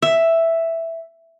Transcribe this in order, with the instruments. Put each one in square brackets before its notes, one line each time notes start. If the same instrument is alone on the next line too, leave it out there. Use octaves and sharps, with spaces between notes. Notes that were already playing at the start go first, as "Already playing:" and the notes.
[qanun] E5